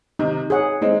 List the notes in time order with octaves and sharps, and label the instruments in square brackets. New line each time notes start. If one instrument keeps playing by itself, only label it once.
[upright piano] C3 D#3 [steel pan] D#4
[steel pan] G#4 C#5 F#5
[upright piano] G#3 C4 [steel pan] D#4